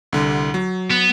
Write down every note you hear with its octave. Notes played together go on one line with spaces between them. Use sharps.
C2 D3
F#3
B3